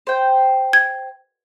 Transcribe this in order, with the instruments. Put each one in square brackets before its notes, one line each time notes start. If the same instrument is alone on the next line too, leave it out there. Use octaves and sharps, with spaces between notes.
[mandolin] C5 G5
[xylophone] G#6